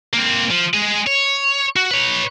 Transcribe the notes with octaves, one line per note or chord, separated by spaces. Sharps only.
A#3 C4
F3
G#3 G#4
C#5
F#4
B4 C#5